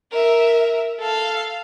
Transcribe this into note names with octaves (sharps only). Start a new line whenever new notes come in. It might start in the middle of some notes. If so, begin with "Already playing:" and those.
A#4 E5
A4 F5